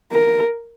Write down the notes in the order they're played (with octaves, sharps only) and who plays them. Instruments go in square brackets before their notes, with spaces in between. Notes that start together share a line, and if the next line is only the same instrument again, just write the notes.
[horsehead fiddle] A#4